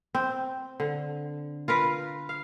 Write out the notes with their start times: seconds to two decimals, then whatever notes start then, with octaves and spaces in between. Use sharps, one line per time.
0.15 C4
0.80 D3
1.68 F4 A#4 B4
2.29 F5